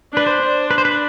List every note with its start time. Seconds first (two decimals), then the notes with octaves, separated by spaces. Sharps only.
0.13 D4 B4
0.27 C5
0.41 D4
0.71 B4
0.78 C5
0.85 B4